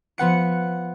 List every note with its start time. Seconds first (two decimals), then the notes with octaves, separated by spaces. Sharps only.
0.18 F3 B3 F#5 C#7